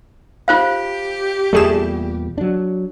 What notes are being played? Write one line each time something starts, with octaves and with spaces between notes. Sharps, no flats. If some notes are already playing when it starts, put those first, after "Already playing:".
F4 G4 C5 F5
E2 A#2 G3 A3 G#4 E7
F#3 D4